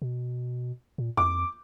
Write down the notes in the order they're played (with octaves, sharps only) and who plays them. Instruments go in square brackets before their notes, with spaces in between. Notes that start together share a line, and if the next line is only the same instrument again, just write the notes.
[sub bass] B2
A#2
[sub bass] F2 [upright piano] D6